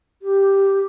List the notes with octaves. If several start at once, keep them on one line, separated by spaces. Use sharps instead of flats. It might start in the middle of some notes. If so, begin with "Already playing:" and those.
G4